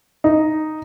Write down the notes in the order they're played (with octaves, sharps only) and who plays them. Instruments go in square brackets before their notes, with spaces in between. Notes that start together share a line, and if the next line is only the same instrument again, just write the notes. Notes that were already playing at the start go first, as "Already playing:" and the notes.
[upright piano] D#4